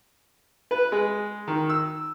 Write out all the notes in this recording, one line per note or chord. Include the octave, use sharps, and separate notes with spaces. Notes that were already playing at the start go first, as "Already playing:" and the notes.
B4
G#3
D#3
E6